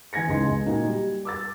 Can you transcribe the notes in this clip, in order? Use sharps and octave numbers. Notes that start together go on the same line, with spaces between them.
E3 G#5 G#6 A#6 C#7
G#1 C#2 C#3 D#4 C6
C#2
A#2 F#3 A#3 D#4 F#4
G3
D6 E6 A6